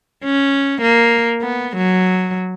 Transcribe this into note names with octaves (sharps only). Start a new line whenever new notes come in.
C#4
A#3
B3
F#3